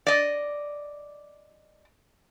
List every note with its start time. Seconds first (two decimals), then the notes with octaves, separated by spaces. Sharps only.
0.07 D5 D#5